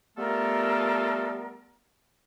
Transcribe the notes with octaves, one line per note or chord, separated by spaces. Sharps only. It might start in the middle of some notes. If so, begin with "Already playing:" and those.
G3 A3 B3 F4 A4 A#4